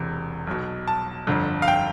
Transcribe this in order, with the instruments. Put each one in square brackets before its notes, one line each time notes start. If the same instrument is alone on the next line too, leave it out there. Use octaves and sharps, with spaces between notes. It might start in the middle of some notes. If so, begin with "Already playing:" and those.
Already playing: [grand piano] E1 E2 C3
B1 B2
A5
G1 F2 D3
F5
G5